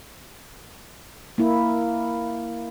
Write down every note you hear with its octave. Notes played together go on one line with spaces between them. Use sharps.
A#3 E4